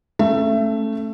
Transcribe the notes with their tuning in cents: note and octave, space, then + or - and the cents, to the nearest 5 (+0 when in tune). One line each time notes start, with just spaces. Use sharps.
A3 +0 C#4 -20 E5 +25